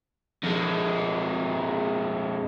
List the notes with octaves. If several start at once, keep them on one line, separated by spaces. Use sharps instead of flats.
F2 G#3